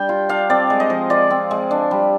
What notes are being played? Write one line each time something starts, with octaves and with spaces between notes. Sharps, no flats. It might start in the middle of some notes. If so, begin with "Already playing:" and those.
Already playing: G3 D4 G5
F4
D4 F5
C4 D5
G#3
D#5
F3
F4 D5
C4
G#3
D4
G3